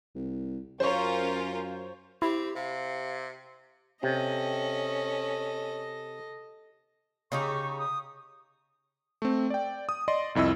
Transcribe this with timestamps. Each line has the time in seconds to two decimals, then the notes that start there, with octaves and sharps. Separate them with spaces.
0.15 C2
0.80 F#2 C#4 F4 A#4 C5 C#5
2.22 C4 E4 G4
2.56 C3 F5
4.03 C3 C#4 A4 D#5
7.32 C#3 D#4 G4 C#6
7.78 D#6
9.22 A3 C4
9.50 D5 G5
9.89 D#6
10.08 D5 D#5 C6
10.35 C2 F2 E4 D#5 E6